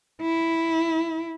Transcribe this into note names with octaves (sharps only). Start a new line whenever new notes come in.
E4